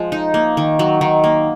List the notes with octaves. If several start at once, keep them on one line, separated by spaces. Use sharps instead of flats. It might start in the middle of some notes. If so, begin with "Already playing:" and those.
Already playing: F3 G#3
D#4
A#3
D#3
F#3
D#3
A#3